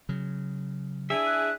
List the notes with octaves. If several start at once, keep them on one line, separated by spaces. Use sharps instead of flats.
C#3 F#3
D4 E4 G#4 E5
F#6